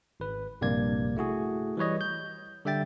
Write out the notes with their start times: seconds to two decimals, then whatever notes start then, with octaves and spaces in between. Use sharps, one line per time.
0.20 G#1 B4
0.61 A#1 G2 C3 A#3 D5 G#6
1.17 A3 E4 F#4 G#4
1.77 E3 G3 B4 C#5 D#5
2.01 G6
2.65 D3 G3 E5 G5 A6